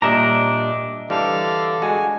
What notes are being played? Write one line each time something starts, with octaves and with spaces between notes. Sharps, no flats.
A#2 G3 D4 D#5 E5 A#5
D3 E3 G3 F5 A5
G#3 F#4 G#5